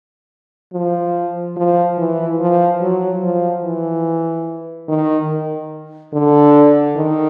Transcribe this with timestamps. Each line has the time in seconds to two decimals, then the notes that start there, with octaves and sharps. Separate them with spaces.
0.73 F3
1.57 F3
1.98 E3
2.40 F3
2.81 F#3
3.23 F3
3.64 E3
4.89 D#3
6.13 D3
6.96 D#3